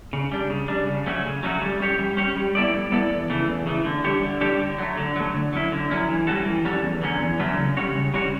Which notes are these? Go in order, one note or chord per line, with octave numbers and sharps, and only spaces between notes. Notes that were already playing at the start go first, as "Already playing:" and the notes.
C#3
G3 D4
C#3
G3 D4
C#3
F#3 A3 C#4 F#4
C#3
F#3 A3 C#4 F#4
G3
C#4 G4 C#5
G3
C#4 G4 C#5
G3
B3 E4 A4 D5
G3
B3 E4 A4 D5
E2
C#3 E3 A3
E2
C#3 E3 A3
D3
G3 D4 G4 C#5
D3
G3 D4 G4 C#5
D3
F#3 A3
D3
F#3 A3
D3
F#3 C#4 E4
D3
F#3 C#4 E4
E3
G3 C#4 F#4 A4
E3
G3 C#4 F#4 A4
E2
D3 F#3 A3 C#4
E2
D3 F#3 A3 C#4
C#3
G3 C#4 F#4 C#5
C#3
G3 C#4 F#4 C#5